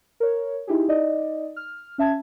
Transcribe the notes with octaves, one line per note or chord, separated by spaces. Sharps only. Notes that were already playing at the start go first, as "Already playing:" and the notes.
A#4 C#5
D#4 E4 G4 G#4
D#4 D5 D#5
F6
C#4 E5 A5 G#6